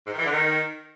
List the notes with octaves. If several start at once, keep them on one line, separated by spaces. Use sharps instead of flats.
G#2
D#3
E3
D3
D#3